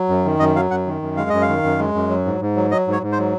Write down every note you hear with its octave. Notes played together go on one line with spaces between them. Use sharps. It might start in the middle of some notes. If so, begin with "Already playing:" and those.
Already playing: F#3
F#2
D#3
F#2 D#5
F#3 F5
F#2 F#5
D#3
F#2
G#3 F5
F#2 D#5
F5
D#3
F#2
G#3
F#2
F#3
G#2
G#2
F#3
F#3 D#5
G#2
C#5
G#2
C5
F#3